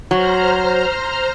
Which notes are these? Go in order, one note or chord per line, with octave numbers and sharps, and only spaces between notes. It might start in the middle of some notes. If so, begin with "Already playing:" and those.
F#3 C5 A#5 F6